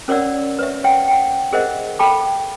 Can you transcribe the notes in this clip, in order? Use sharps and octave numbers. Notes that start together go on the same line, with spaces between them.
C#4 A#4 C#5 D5 F#5 E6
B4 C#5 E5
C#5 E5 F#5 G5
F#5 G5
G#4 A#4 C5 D#5 E5 F#5
A4 F5 G5 A5 B5 D6